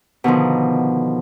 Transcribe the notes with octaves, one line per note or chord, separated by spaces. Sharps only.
B2 D3 D#3 F3